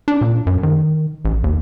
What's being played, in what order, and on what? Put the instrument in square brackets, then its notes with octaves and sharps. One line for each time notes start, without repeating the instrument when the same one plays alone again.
[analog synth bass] D4
A#2
F#2
D#3
A1
D#2